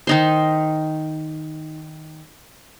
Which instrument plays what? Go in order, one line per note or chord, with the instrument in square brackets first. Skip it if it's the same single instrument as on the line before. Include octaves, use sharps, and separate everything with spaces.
[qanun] D#3 D#4 C5